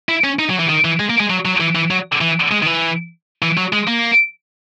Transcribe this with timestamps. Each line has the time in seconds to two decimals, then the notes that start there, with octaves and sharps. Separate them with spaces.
0.09 E4
0.24 C#4
0.39 D#4
0.49 F#3
0.59 E3
0.69 D#3
0.85 E3
1.00 G#3
1.10 A#3
1.20 G#3
1.30 F#3
1.45 F#3
1.60 E3
1.75 E3
1.91 F#3
2.21 E3
2.51 G#3
2.62 D#3
2.66 E3
3.42 E3
3.57 F#3
3.73 G#3
3.88 A#3